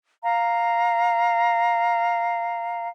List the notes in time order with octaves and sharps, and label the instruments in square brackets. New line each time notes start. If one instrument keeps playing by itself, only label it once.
[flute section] F5 A#5